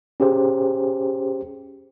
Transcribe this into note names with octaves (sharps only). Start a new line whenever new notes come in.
C#4 G4 G#4 C5